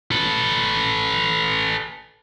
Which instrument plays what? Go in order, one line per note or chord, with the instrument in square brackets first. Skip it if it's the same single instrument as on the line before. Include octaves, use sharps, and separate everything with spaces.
[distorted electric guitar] A4 B4